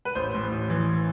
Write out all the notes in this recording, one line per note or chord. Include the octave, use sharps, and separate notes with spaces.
B4
A1 C5
A2
A1
E3